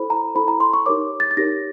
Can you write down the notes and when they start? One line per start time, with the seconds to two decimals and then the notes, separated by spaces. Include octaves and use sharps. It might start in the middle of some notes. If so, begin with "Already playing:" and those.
Already playing: E4 A4 C5 B5
0.10 A#5
0.35 E4 A4 C5 B5
0.48 A#5
0.60 C6
0.73 C#6
0.86 D#4 G4 A#4 C#5 D6
1.20 A6
1.31 A6
1.37 D#4 G4 A#4 C#5 A#6